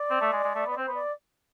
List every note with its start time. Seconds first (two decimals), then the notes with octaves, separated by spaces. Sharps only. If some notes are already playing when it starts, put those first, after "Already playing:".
Already playing: D5
0.10 C4
0.21 A3
0.32 G#3
0.43 G#3
0.55 A3
0.66 B3 D5
0.77 C4 C5
0.88 B3
0.94 D5